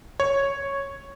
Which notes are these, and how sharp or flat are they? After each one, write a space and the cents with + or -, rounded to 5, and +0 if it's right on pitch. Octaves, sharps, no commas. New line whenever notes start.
C#5 -5